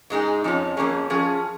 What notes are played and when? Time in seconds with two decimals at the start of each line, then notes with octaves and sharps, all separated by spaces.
0.10 G#2 G#3 D#4 G#4
0.44 F2 F3 C#4
0.77 F2 D#3 A#3 C#4 G#4
1.10 F3 C#4 G#4